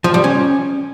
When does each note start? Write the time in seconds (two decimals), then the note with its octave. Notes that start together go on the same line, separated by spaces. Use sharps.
0.04 F3
0.14 G3
0.24 C#4